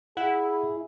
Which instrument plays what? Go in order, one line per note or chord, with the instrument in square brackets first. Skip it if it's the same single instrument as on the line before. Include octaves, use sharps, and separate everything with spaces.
[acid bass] E4 [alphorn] G#4 [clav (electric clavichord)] F#5